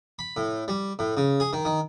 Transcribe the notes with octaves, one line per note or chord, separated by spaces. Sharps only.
B5
A2
G3
A2
C#3
G#4
D#3
D#3